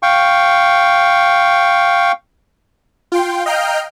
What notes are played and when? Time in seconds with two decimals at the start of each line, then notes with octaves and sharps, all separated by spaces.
0.03 F5 G5 C#6
3.12 F4 G5 C6
3.46 D#5 F5 G5 A#5 F6 G6